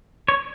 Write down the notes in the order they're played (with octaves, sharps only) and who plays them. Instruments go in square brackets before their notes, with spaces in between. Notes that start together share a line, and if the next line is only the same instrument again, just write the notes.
[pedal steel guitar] C#5